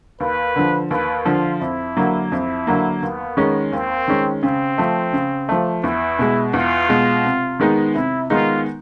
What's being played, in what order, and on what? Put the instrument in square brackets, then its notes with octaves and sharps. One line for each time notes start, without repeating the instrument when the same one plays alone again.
[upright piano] D#2 [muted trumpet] B4
[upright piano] D3 F3
[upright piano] D#2 [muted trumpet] B4
[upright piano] D3 F3 [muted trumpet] F4
[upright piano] F2 [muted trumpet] E4
[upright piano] D3 F#3 A#3
[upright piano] F2 [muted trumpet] E4
[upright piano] D3 F#3 A#3
[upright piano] D#2 [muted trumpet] B3
[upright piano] D#3 G#3 C#4
[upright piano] D#2 [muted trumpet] C4
[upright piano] D#3 G#3 C#4
[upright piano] C#3 [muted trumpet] C4
[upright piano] F3 A3
C#3
F3 A3
[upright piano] E2 [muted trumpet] E4
[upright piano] B2 G#3
[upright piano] E2 [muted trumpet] F4
[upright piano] B2 G#3
C3
D#3 G#3 B3 D#4
[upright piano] C3 [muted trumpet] E4
[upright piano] D#3 G#3 B3 D#4 [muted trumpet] F4